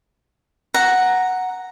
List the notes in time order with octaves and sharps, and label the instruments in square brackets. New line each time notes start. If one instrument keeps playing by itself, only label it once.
[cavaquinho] F#5 A#5